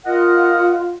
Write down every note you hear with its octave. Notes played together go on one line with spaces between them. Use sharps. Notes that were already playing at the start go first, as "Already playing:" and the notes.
F4 A#4 D#5 F#5